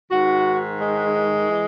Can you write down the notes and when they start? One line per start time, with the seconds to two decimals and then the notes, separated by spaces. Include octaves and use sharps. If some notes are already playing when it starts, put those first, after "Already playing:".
0.11 G#2 D#3 F#4
0.79 G#3
1.51 E3